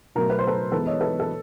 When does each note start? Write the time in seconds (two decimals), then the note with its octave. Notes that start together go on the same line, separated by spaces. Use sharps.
0.15 B2 F#3 A3 A#4
0.30 B4
0.39 C5
0.47 A4 B4
0.72 E3 G#3 B3 A4 B4
0.86 C#5 D#5
1.01 A4 B4
1.20 A4